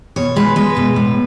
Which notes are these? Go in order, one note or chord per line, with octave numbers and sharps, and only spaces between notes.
B2 C#5
G#3 B4
G#3 B4
B2
A2